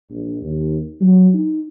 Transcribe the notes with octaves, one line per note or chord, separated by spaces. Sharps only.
A#1
D#2
F#3
D#4